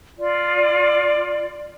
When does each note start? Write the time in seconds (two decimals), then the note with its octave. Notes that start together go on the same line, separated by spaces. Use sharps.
0.17 F4 D5